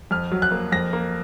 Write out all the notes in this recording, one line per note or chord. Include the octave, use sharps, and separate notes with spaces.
F2 F6
F#3
F#6
A#3
F2 A#6
A#3